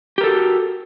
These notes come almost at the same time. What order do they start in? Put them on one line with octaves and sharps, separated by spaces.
G4 A#4 A4 F#4